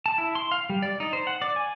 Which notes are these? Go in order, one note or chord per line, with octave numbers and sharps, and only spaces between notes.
A5
E4
C6
F5
G3
D5
D#4
C5
F#5
D5
G#5